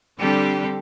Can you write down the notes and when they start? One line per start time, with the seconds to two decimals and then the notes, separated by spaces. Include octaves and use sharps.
0.18 D3 G3 C4 D4 G4 A4